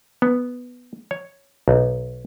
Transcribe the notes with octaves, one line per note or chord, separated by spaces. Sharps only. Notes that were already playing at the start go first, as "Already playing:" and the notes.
B3
C#5
B1